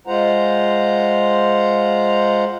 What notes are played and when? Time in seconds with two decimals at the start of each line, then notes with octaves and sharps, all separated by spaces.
0.07 G#3 F4 C5 F#5 A#5